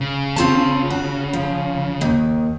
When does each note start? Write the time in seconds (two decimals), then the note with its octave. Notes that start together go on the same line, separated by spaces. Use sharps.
0.01 C#3
0.36 C4 F4 A5
0.90 F#4
1.33 F3
2.01 D#2 D#3